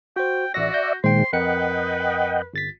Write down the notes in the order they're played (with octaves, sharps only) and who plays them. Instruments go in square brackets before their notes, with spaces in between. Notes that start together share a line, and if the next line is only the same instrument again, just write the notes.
[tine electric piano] F#4 C5 [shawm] G5
[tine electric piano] A1 A#6 [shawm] F#4 [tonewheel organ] D5 E5
[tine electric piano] G6 A#6
[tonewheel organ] A#2 D#3 G#3 [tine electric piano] C5 G5 [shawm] C6
[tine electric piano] F2 A#4 C#7 [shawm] B4 [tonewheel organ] D#5 F#5 G5
[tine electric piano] G1 A6 B6